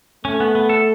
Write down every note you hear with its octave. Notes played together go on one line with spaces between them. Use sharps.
A3 C#4
B3
B3
A4